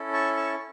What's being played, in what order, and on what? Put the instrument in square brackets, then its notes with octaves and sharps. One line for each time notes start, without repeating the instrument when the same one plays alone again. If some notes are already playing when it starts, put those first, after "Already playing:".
Already playing: [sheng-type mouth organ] C#4 E4 A4
A5 C#6
A5 C#6